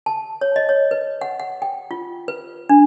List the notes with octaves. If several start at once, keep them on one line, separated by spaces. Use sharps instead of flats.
A5
C#5
D#5
C#5
B4
F#5
F#5
G5
F4
B4
D4